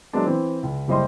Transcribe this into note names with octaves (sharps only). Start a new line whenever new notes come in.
F#3 G#3 A#3 B3 D4
E3 C4
C#2
F#1 G3 C5 D#5 C6